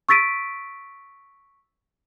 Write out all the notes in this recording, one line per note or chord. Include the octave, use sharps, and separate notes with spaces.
C#6 E6 A6 B6 D7 D#7